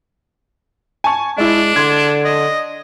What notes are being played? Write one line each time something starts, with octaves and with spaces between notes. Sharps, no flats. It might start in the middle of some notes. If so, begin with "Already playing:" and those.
G#5 A5 C#6
G#3 D4 E4 D5
D3 C6 G#6
D#5